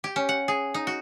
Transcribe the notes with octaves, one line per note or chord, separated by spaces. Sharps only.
G4
C#4
F#5
G#4
D#4
F#4